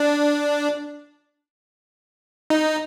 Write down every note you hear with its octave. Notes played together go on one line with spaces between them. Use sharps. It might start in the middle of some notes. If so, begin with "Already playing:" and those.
Already playing: D4
D#4